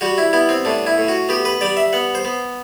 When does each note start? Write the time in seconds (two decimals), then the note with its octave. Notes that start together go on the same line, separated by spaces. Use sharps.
0.01 G3 F#4
0.18 E4
0.33 B3 E4
0.49 C4
0.65 A2 D4
0.87 E4
0.98 A2
1.08 F#4
1.29 B3 G4
1.45 B4
1.61 G3 D5
1.77 E5
1.93 B3 F#5
2.15 C5
2.25 B3